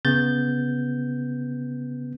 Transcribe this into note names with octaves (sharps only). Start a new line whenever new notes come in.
C#3 B3 G6 A6